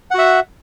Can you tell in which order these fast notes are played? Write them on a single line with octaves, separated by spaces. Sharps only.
F#5 F#4 E5